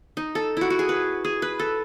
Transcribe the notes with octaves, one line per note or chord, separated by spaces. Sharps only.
D#4
A4
E4 F#4
F#4
G#4
B4
G#4
B4
A4